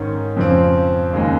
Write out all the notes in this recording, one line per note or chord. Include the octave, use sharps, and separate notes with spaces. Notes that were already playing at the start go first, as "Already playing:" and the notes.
Already playing: G#2 D#3 G#3 C#4
F2 C#3 F3 C4
D#2 C#3 G#3 D#4